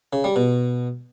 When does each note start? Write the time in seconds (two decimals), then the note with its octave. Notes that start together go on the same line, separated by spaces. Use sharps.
0.13 C#3
0.24 G3
0.36 B2